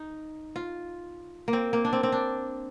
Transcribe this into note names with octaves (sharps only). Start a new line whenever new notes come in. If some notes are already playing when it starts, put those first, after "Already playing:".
Already playing: D#4
F4
A#3
C4
A#3
D4
C4
C4
D4